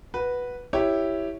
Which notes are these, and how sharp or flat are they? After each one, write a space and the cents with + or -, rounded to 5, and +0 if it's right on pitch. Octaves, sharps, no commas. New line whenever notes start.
F#4 +0 B4 -5
E4 +0 G4 +0 C#5 +0